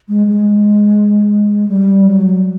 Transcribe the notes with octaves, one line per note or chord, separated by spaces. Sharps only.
G#3
G#3
G3
F#3